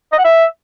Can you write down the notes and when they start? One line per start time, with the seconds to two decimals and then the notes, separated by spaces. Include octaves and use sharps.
0.12 D#5
0.18 F#5
0.24 E5